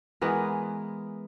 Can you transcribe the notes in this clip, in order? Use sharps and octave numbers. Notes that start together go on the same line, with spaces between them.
E3 G#3 B3 A#4